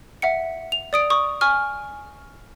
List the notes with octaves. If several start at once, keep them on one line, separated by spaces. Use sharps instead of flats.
E5 F#5 C#7
F7
D5 D#6 D7
C#6 D#6
G#5 C#6 F6